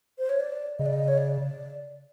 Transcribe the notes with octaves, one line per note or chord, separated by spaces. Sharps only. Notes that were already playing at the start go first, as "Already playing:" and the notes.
C5
C#5
D5
C#3 D#5
D5
D#5
C#5
D5